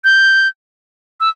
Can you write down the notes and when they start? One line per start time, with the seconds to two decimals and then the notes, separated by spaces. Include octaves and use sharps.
0.04 G6
1.20 E6